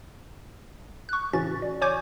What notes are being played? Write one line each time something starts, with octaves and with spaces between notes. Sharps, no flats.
C#6 F#6
A2 C#3 E3 C#4 F#4 A6
D5
C#5 G#5 C#6 D6 G6 G#6